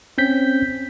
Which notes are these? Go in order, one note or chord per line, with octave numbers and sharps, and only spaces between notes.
C4 C#4 G6 B6